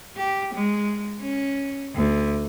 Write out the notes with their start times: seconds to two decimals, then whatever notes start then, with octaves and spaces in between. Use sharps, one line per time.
0.16 G4
0.54 G#3
1.20 C#4
1.95 D2